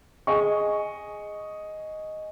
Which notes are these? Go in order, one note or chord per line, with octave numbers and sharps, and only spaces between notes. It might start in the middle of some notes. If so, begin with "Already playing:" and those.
G#4 D#5 C#6